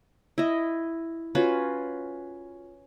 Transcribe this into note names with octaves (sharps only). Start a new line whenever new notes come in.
E4 D#5
C#4 F4 F#4 B4